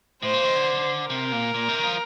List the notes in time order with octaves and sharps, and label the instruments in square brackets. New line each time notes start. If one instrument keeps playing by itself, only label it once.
[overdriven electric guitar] A2 [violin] C5
[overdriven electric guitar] A#2
D#3
D3
[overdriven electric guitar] C3 [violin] A#4
[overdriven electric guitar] A#2
A#2
C3
D#3
F3